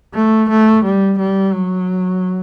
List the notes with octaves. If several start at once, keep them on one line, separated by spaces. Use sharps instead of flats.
A3
A3
G3
G3
F#3